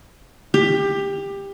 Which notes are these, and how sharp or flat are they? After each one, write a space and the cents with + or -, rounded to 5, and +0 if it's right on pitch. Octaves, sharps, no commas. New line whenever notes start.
G4 +20